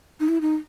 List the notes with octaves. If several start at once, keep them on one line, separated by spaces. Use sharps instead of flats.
D#4
E4
D#4